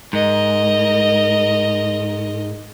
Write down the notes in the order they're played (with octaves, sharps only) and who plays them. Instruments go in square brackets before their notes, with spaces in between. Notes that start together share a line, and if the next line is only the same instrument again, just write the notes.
[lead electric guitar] G#2 [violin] A#4 D#5